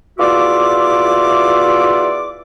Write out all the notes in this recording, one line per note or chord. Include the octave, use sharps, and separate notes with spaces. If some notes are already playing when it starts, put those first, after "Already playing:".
E2 F4 F#4 D5 E5 D6